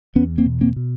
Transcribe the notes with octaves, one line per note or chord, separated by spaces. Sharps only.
E2 B3 C#4
A#3 C4
B2
A#3 C4
B2